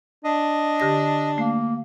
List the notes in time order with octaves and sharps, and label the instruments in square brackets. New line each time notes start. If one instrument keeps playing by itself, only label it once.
[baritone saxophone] D4 [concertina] D#5
[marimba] D3 G4 A#6
[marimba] A3 [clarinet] A#3